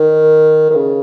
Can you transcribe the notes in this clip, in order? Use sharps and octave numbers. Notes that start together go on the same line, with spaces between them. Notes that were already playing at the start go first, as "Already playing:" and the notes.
Already playing: D#3
D#3
C#3